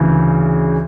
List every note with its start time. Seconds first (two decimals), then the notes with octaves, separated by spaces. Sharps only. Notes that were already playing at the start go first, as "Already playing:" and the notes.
Already playing: D2 C#3 E3